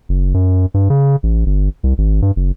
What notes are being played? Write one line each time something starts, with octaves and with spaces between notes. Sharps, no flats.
F#1
F#2
G2
C#3
A1
G1
C2
G#1
G2
F#1